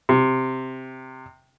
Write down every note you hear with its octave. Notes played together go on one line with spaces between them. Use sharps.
C3